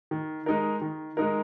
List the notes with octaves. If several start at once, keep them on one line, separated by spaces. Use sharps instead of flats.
D#3
G#3 D#4 A#4
D#3
G#3 D#4 A#4